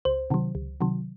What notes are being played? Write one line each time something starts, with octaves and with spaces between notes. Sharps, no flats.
C#2 C5
C3 D#3 F#3
C#2
C3 D#3 F#3